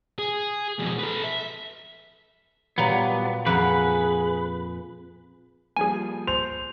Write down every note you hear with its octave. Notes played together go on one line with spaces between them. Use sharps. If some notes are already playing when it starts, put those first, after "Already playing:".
G#4
F2 B2
A4 B4
E5
A#2 F#3 G3 A#3 B3
F2 A#3 G#4 B4 F#5
F3 G3 A#3 G#4 G#5
C5 F7